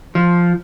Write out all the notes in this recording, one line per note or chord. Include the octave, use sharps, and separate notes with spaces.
F3